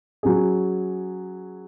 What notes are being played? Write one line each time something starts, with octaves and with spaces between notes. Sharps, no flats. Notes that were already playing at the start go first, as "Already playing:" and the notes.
F#3 C#4 G#4